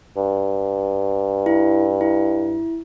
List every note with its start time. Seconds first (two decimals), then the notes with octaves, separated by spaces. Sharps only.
0.17 G2
1.46 E4
2.01 E4